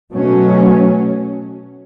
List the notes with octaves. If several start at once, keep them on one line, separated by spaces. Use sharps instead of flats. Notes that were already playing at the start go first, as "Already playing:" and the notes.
B2 F#3 A3 C#4